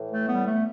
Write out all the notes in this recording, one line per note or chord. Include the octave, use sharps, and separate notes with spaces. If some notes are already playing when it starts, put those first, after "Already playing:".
Already playing: A2 E3
A3
G3 B3
A3